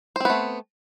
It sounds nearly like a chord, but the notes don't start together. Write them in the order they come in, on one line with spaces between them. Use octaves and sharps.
C5 C4 B3 A3